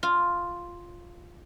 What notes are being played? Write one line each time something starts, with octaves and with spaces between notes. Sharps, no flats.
F4